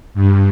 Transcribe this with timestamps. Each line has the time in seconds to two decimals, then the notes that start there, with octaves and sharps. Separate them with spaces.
0.14 G2